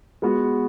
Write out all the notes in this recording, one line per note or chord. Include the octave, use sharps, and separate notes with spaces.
G#3 B3 F#4